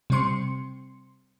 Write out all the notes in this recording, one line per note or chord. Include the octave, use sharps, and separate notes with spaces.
C3 G3 C4 C6 C#7